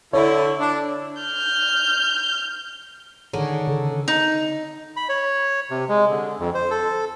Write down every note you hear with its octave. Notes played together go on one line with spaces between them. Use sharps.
D3 E4 C#5
D4
F6 G6
D3 D#3 G#4 A#4 C#5
C#3 A4
D#4
B5
C#5
C3
G#3
D3
F2
C5
A4